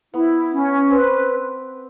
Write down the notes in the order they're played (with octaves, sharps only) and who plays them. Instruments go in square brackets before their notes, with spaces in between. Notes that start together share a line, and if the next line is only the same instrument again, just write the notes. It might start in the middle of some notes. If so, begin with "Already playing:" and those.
[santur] B3 [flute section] E4
[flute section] C#4
[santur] C4 [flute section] B4